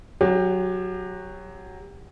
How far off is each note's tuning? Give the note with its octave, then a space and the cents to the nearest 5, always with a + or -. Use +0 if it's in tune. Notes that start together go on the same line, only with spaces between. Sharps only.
F#3 +0 G4 +30